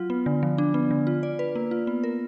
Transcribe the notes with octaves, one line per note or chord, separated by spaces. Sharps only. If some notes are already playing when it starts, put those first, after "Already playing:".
Already playing: F#3 F4
B3
D3
F3
D4
B3
D3
F4
D5
B4
A#3
F4
B3
A#4